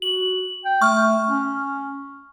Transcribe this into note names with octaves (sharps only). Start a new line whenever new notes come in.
F#4 F#7
G5
A3 C#6 F6
C#4